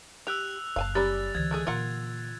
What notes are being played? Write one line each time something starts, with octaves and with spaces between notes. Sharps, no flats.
G4 E6 F#6 F7
F#1 F5 G#5 A5
G3 C#4 G4 D5 A#5 B5 A6
C#2 D3 E3 G#6 A6
G#3 A3 G#4
A#2 F4 A#4 F#5